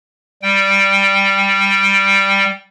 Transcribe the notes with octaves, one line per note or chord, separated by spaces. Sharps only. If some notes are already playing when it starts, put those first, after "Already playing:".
G3 G5